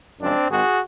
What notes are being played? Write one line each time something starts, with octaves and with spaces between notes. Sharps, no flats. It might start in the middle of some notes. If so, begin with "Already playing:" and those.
F#2 C#3 F3 G#3 C4 D4
G#2 D#3 G#3 C4 F#4 G#4